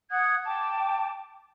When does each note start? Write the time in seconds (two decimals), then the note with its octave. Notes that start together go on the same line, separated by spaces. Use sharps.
0.11 F#5 D#6 F#6 G#6
0.45 G5 A5 D6